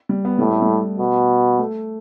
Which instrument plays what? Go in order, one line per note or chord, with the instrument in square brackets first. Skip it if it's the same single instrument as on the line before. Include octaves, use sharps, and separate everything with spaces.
[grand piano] G3
B3
[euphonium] A2 [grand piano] G3
[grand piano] A3
G3
[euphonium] B2
[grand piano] A3